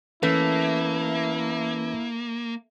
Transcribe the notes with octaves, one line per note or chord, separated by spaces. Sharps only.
E3 A3 A#3 C#4 E4 B4